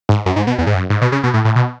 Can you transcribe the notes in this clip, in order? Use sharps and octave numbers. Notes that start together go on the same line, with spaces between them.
G#2
F#2
G#2
B2
E2
G#2
F#2
G#2
B2
C#3
B2
A2
A2
B2